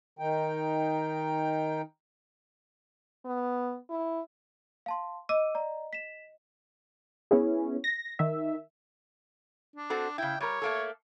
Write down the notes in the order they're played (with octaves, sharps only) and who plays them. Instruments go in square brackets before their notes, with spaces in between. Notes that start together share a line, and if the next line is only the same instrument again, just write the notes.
[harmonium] D#3 D#4 G5
[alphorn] B3
E4
[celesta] F5 A5 C6
[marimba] D#5 [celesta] D6 E6 D#7
[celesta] D5 A#5
B6 E7
[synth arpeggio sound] B3 C#4 E4 G#4
A#6
D#3 E5
[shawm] D4
[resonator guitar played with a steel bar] C4 F#4 A4
[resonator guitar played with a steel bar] C#3 E4 [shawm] G5
[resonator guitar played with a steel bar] G3 A#4 [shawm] C#5
[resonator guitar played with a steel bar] A3 A#3 A4